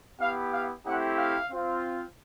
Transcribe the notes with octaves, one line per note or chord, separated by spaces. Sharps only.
B3 E4 G4 F5
F5
A3 C4 E4 G4 F#5
F5
C4 F4